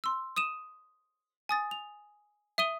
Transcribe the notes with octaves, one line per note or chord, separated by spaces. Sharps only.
C6 E6
D#6 D#7 E7
G#5 D#6 A6
F7
E5 D#6 D#7 G7